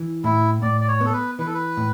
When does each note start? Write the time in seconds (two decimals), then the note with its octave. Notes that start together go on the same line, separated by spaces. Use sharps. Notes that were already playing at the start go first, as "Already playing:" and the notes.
Already playing: E3
0.24 A2 E4
0.62 A2 D5
0.81 D5
0.88 C#5
1.01 B3 A4
1.13 B4
1.39 E3 B4
1.46 A4
1.54 B4
1.77 A2